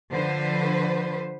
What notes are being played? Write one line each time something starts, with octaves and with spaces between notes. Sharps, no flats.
D3 F3 B4 C5